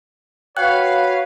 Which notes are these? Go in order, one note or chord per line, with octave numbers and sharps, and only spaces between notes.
F#4 B4 C#5 F5 G5 F#6